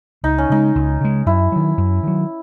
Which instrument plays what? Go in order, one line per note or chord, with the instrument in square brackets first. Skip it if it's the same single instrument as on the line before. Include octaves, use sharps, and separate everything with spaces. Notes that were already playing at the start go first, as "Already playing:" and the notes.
[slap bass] C#2 [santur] D#4
[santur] C#4
[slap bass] C#3 G#3 [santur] D#4
[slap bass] C#2
C#3 G#3
[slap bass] F#2 [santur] E4
[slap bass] D#3 F#3
F#2
D#3 F#3